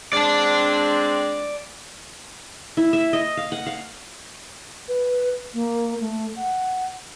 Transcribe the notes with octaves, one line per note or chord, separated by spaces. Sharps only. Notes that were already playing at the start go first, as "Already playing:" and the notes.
G#3 C4 D4 D5 A5
E4
E5
D#5
F5
F#5
F5
B4
A#3
A3
F#5